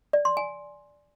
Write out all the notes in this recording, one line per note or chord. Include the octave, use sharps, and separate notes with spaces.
D5
C6
G#5